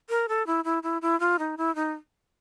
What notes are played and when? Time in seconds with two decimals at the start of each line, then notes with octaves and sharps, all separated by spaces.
0.09 A#4
0.28 A4
0.46 E4
0.64 E4
0.83 E4
1.02 E4
1.20 F4
1.39 D#4
1.57 E4
1.75 D#4